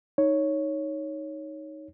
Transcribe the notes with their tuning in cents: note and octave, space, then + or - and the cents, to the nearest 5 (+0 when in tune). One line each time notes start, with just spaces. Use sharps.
D#4 +0 C#5 +0